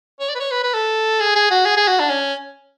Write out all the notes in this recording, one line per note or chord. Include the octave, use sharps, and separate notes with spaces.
C#5
D5
B4
C#5
B4
B4
A4
G#4
G#4
F#4
G#4
G#4
F#4
D4
C#4